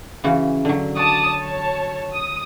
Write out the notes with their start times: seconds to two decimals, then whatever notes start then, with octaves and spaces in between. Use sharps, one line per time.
0.24 C#3 E3 F#4
0.65 D3 F#3
0.96 F#4 D5 A5 D#6
1.37 C#5 A5
2.13 D#6